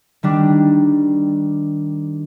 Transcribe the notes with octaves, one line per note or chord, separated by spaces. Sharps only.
D#3 G3 D4